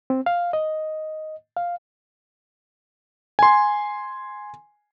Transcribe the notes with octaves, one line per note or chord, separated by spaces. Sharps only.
C4
F5
D#5
F5
G#5 C6